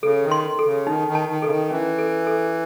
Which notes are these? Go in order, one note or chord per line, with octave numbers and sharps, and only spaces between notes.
C#3 A4
D#3
C6
A4
C#3
D#3 D#4
D#3
A5
D#3
C#3 A4
D#3
E3 C#4
A4
A4